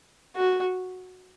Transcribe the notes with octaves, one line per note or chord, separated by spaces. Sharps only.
F#4